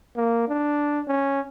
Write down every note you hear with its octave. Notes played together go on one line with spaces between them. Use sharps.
A#3
D4
C#4